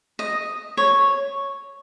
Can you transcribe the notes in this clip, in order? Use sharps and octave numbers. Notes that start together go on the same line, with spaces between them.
D#5
C#5